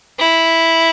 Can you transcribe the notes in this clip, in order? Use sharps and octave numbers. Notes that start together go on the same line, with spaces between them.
E4